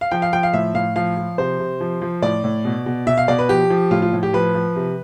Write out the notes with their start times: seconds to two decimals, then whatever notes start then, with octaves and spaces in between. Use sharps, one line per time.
0.01 F5
0.11 F3 G5
0.22 F5
0.33 F3 G5
0.43 F5
0.53 A2 E5
0.74 A2 F5
0.96 F3 F5
1.17 F3
1.38 C3 C5
1.59 C3
1.81 F3
2.02 F3
2.22 A2 D5
2.44 A2
2.65 B2
2.86 B2
3.07 B2 E5
3.18 F5
3.28 B2 D5
3.39 B4
3.49 F3 G4
3.70 F3
3.91 A2 F4
4.02 F4
4.13 A2
4.23 G4
4.33 F3 B4
4.55 F3
4.76 C3